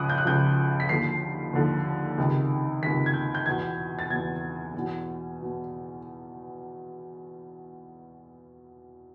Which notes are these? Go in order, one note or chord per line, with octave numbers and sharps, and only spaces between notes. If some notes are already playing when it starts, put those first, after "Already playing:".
Already playing: C#2 C#3 F3 D6 D#6 F#6
G6
F#6
C#2 C#3 F3 G6
B6
D#2 D3 F3 C7
D#2 D3 F3
C#2 C3 D#3
C#2 C3 D#3 B6
G#6
G6
G6
E2 B2 G#6
A6
E2 B2 G#6
E2
B2
B2